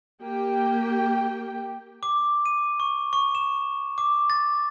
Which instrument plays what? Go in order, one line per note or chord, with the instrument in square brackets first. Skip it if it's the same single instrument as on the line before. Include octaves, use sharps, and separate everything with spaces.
[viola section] A#3 G4 G5
[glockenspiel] D6
D#7
C#6
C#6
E7
D6
A6